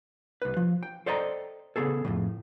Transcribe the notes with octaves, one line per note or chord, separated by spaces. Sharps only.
C2 B4
F3
G5
A4 C5 D5 D#5 G5 A#5
C#3 E3 B3 G#4 A4
F2 A2 C#3